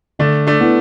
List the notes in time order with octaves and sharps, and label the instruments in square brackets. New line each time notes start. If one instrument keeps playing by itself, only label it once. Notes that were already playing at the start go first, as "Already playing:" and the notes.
[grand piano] D3 [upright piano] A3 D4
[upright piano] A3 D4
[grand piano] B3 E4